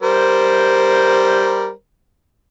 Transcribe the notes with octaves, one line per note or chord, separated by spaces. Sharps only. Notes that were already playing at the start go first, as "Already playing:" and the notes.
G3 A#4 C5